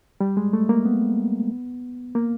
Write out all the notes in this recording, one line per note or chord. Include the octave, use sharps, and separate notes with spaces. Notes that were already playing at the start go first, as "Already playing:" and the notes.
G3
G#3
A3
A#3
B3
A#3